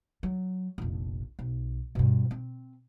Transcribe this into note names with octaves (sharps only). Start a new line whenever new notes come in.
F#3
F1 A#1
B1
G2 B2
C4